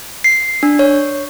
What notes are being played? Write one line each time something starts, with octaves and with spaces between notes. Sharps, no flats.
C7
D4
C#5